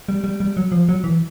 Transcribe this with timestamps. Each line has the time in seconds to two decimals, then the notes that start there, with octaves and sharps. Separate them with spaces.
0.09 G3
0.24 G3
0.40 G3
0.57 F#3
0.72 F3
0.89 F#3
1.04 E3